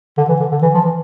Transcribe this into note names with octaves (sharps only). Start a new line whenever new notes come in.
D3
E3
D3
D3
E3
F3
E3